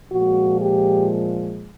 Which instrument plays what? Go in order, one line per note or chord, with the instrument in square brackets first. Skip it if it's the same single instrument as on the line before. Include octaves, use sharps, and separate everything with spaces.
[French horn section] A#2 F3 G#3 F#4
G4